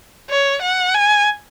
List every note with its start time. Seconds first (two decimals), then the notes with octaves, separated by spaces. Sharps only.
0.30 C#5
0.62 F#5
0.94 G#5